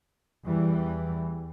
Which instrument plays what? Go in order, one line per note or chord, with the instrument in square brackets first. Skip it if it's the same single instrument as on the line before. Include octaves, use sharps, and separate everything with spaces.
[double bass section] E2 E3 G3